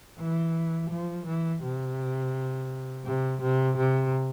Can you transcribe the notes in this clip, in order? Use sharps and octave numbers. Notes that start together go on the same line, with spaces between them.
E3
F3
E3
C3
C3
C3
C3